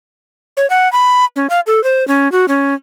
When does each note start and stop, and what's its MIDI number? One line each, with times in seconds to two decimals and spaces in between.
0.57 0.69 73
0.70 0.91 78
0.92 1.25 83
1.36 1.47 61
1.50 1.60 77
1.67 1.83 69
1.84 2.06 72
2.08 2.31 61
2.32 2.46 66
2.48 2.74 61